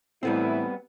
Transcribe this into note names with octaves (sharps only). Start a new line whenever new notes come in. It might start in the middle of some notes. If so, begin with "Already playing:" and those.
A2 E3 G3 B3 C4 E4